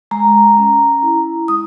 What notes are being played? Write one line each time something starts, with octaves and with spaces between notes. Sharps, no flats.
G#3 A#5
C#4
E4
G#3 D#6